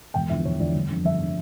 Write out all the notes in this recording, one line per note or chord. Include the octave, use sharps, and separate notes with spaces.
E1 G5
E2 D3 F3 E5
E1 C#5
E2 D3 F3 D5
G1
F2 D3
G1 E5
D3